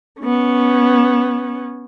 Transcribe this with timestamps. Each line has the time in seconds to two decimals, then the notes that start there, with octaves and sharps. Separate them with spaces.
0.21 B3 C#4